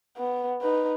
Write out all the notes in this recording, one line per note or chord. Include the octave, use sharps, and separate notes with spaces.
B3
D#4 B4